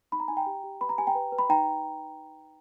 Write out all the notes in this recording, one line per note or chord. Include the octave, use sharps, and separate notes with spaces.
D#4 B5
A#5
D#4 G#5
G5 A#5
G4
G4
B4 B5
A#5
G4 G#5
G5 A#5
B4
B4
B5
D#4 G5 A#5